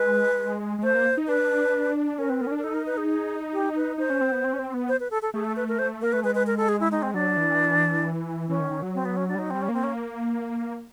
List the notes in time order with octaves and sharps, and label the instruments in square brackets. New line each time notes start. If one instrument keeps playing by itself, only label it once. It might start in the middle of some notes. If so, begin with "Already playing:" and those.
Already playing: [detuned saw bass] G#3 [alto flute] B4
[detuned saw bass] G#3
[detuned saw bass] A3 [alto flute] C5
[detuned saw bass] A#3
D#4
[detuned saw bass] D4 [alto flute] B4
[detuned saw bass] C#4 [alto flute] A#4
[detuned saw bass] C4 [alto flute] B4
[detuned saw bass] B3 [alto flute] A#4
[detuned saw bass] C#4
D4
[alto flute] A#4
[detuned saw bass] D#4 [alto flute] A4
[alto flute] A#4
B4
G#4
G4
B4
[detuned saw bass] D#4 [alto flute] C5
[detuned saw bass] C#4
C4
B3
C4
C#4
C4
B3
[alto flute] C5
B4
A4
A4
[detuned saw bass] A3 [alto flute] G#4
[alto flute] A4
B4
A#4
C5
[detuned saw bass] A#3 [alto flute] A#4
[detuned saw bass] A3 [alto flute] B4
[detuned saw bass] G#3 [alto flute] B4
[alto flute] B4
A#4
A4
G#4
E4
D#4
C4
[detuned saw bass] F#3 [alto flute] D4
[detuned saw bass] E3
[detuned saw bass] E3 [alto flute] C#4
[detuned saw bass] D#3
D#3
F#3
[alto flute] C4
B3
C#4
D4
[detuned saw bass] G3
[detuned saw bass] F#3 [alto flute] D#4
[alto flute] C4
[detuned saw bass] G3
[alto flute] C#4
[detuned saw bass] A#3 [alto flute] C4
[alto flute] C#4